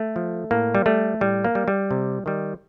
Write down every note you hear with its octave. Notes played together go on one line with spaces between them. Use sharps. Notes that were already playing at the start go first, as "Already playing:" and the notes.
Already playing: A3
F3
A2 A#3
G3
G3 A3
A2 G3
A#3
G3
G3
C3
D#3 G3